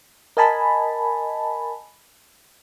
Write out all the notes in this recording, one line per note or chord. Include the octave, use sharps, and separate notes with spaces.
A#4 D#5 G#5 A5 B5